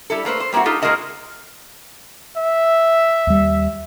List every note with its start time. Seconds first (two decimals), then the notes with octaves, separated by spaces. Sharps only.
0.10 G3 E4 A4
0.25 A3 A#3 B4 C5
0.40 C5
0.53 G3 A#3 C4 E4 F#4
0.65 D#4 F4 G4 A4
0.82 A#2 G#3 F#4 A#4 D#5 A5
2.36 E5
3.27 D#2 G3